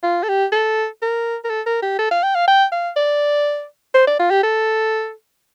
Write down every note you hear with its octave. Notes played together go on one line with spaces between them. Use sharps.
F4
A4
G4
A4
A#4
A#4
A4
A#4
G4
A4
F5
G5
F5
G5
F5
D5
C5
D5
F4
G4
A4